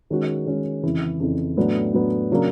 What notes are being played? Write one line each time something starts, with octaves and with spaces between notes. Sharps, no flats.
D#3 G#3 C#4 F#4
D#3 G#3 C#4 F#4
F2 C#3 E3
F2 C#3 E3
A2 F#3 B3 D4
A2 F#3 B3 D4
C#3 F#3 A#3 D4